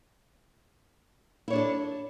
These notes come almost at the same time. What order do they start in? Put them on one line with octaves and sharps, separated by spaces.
E4 C#5 D4 G#4 A4